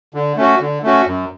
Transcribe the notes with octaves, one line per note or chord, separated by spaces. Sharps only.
D3
A3 C#4 F#4
D3
A3 C#4 F#4
F#2